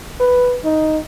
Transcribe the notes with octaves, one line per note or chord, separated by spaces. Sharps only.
B4
D#4